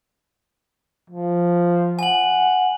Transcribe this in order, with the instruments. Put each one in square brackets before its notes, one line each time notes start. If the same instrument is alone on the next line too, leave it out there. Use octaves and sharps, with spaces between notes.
[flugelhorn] F3
[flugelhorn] F#5 [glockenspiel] G#5 F#7